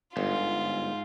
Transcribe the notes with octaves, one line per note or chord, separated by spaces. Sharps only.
G1 G#2 F4